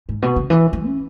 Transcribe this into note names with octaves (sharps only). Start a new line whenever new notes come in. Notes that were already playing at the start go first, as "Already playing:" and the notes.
G#2
B2
C#3
E3
F#3
C#4